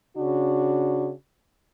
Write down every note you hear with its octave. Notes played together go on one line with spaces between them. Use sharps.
C#3 D4 F#4